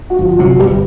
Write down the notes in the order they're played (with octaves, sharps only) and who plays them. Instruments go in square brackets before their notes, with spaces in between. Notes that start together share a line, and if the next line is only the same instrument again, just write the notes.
[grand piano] F#4
[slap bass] G1 [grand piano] F3 F4
[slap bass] C3 [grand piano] F#3 F#4
[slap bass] G1 [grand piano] G3 G4